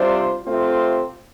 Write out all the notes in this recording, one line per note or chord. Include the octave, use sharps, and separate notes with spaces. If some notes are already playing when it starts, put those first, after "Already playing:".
Already playing: C3 G3 D4 F4 C5
C3 A3 C4 F4